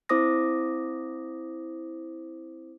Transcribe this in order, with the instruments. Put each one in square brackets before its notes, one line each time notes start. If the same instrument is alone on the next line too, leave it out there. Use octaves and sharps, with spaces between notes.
[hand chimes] C4 E4 C5 D6 D#6 A#6